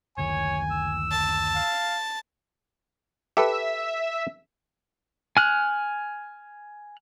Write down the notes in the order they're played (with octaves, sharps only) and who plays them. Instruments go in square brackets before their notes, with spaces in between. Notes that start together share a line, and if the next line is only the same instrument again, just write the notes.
[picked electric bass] F#1 D2 D#3 [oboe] C#5 [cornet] G#5
[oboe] E6
[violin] A5
[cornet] F5
[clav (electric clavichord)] G4 A4 B4 [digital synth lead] E5
[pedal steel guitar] G#5 F6 F#6